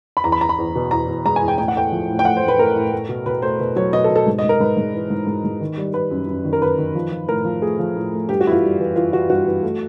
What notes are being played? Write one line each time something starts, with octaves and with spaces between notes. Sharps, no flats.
B5
E2 A#5
B5
E2 A#5
B5
E2
B2
E2 A#5
E2
G#3 A#5
G#5
E2
G5
A2 G5
F#5
A3 G5
F3
A2
G5
A3 F#5
C5
A2
B4
A3 A#4
A2
A3
B2
B2 B4
A3 C5
B2
F#3 C#5
B2 D#5
A4
B2
A4
G#2
D#5
G#2
A#4
G#2 B4
G#2
E3
G#2
G#2
G#2
D#3
G3
G3 B4
F#2
F#2
D#3
A#4
D#3 B4
D#3
F3
F3
A2 A#4
F3
A3 G#4
F3
A2
A3
G2 G4
F#4
E3 E4
F4
G3
E3
E3 F4
E3 F#4
G2 F#4
E3
A3